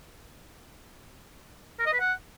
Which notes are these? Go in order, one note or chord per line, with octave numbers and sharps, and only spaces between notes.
A#4
D#5
B4
F#5